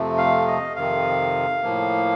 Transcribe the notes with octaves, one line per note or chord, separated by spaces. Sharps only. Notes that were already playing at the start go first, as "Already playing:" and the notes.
Already playing: F2 C3 F3 A3
F5
D#5
F2 C3 D#3 F5
A2 F3 A#3